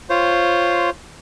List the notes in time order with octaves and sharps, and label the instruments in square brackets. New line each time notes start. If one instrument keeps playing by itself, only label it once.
[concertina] F4 C5 C#5